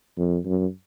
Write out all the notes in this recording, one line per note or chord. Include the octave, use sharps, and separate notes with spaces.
F2
F#2